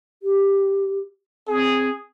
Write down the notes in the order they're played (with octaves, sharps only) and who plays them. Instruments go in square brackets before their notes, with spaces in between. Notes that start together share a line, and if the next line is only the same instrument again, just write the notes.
[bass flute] G4
[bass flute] C4 [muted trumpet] G#4